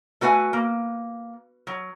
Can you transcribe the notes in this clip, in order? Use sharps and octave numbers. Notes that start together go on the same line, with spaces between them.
A3 F#4 B4 F5 G#5
A#3
F#3